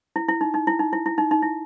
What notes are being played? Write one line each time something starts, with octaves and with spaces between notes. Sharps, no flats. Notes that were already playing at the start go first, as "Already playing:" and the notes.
E4
E4
D#4
D#4
E4
D#4
E4
E4
D#4
D#4
E4